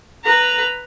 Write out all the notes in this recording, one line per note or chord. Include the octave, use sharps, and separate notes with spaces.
B4 A#5